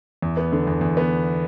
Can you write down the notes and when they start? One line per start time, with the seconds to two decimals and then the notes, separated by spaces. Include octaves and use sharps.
0.22 E2
0.37 B3
0.52 D3
0.67 E2
0.81 E2
0.97 B3